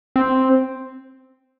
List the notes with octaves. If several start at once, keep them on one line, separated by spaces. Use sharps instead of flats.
C4